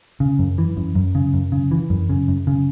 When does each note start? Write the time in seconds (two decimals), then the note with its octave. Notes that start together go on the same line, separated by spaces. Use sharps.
0.20 C#3
0.39 F#2
0.58 E3
0.77 F#2
0.95 F#2
1.15 C#3
1.34 F#2
1.52 C#3
1.71 E3
1.90 F#2
2.09 C#3
2.28 F#2
2.47 C#3